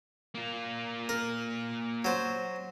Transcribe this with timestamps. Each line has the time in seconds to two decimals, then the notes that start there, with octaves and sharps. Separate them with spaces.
0.35 A#3 F4
1.09 A#4
2.05 F#3 C5